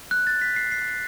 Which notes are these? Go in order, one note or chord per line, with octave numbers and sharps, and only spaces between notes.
F#6
A6
B6
C7
C7